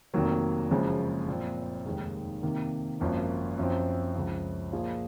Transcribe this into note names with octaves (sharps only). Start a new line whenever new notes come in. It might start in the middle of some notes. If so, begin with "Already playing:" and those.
F1 F2 D#3 F#3 A#3
F#1 F#2 C#3 F3 G#3
A#2 F3 C4
F1 D#2 D#3 G#3 D#4
C3 D#3 A#3
G#1 F#2 F3 A#3
F#2 F3 C4
C#2 C#3 F3
A#2 F3 A#3 F4 G#4